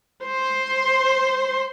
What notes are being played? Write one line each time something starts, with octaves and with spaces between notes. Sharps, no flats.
C5 C6